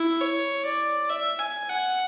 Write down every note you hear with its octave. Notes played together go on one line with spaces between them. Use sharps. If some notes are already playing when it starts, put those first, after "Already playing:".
Already playing: E4
C#5
D5
E5
G#5
F#5